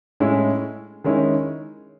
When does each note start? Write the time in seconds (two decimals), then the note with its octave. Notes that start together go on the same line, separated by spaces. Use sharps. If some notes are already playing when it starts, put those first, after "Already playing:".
0.20 A2 G#3 C#4 E4
1.04 D#3 G#3 C#4 E4